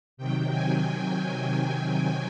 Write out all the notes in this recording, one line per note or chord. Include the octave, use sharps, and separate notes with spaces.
C3 D#3 F#3 G5
G#5